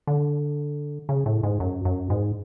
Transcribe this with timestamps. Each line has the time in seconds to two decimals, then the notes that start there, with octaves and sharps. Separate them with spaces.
0.07 D3
1.09 C#3
1.26 A2
1.43 G#2
1.60 F#2
1.85 F#2
2.10 G#2